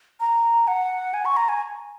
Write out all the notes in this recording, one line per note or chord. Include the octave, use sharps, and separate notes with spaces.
A#5
F#5
G#5
C#6
A#5
G#5